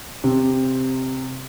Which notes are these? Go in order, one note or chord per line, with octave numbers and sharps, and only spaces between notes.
C3